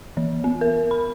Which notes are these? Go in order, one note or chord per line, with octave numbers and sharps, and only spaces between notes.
E3
B3
A#4
B5